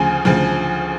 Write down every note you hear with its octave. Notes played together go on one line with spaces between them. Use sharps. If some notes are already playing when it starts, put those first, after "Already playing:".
Already playing: D2 C#3 F3 G#5
D2 C#3 F3